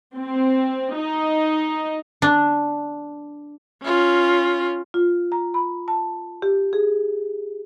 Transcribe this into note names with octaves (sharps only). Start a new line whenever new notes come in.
C4
D#4
D4
C#4 F4
F4
A#5
B5
A5
G4
G#4